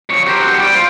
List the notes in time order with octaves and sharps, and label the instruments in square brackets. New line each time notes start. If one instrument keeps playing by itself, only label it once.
[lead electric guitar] F2 C#5
[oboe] G4 [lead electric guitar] A#4 C5
[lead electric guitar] C4 F#4
G3 D5
[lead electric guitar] F4 [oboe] C5